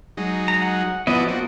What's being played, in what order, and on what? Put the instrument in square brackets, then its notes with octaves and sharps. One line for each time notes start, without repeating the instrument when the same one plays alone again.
[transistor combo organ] F#3 G#3 D#4
[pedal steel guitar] A#5
F#5
[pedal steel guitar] F3 B3 D#5 [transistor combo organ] E4 F#4 D5
[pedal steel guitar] F3 A#3 [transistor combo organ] C4 F#4